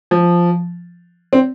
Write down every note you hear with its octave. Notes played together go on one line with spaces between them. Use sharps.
F3
C4